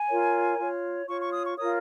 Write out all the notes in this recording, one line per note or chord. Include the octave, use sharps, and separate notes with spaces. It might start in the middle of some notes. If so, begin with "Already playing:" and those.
Already playing: G#5
F4 A#4 C#5
F4 C#5
F4 C#5 C#6
C#6
D#6
C#6
F4 A#4 C#5 D#6